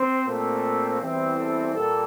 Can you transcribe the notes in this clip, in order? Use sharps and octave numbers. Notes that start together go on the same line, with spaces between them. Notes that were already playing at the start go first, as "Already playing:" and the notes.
Already playing: C4 C5
A#2 A3 C4
E2 E3 G3 C4
A4
A#2 G3 A#3 A4